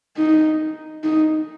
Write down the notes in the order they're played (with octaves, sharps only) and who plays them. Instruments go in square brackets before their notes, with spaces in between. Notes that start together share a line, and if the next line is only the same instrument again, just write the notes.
[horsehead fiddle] D#4
D#4